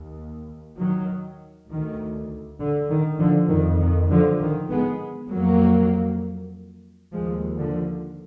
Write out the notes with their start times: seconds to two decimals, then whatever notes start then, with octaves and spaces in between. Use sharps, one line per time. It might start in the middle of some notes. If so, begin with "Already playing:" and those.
Already playing: D#2
0.77 D#3 F#3
1.69 D2 D#3
2.59 D3
2.90 D#3
3.19 D3 F3
3.50 F2 D#3
3.80 D#3
4.10 D3 F3
4.41 D#3
4.71 G#3 B3
5.31 F2 F#3 A#3
7.13 D#2 F3 G#3
7.59 D3 F3